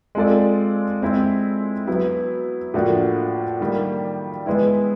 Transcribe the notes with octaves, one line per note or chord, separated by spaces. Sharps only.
G#3 C4 F4 A4 D5
G#3 C4 E4
F#3 B3 E4
A2 F3 A#3 D4 F#4
D#3 G3 A#3
E3 G#3 B3 E4